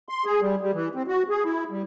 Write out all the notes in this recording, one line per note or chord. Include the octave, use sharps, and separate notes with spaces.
C6
G#4
G3
G3
E3
C4
F#4
G#4
E4
G3